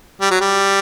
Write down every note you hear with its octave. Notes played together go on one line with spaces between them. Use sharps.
G3
F#3
G3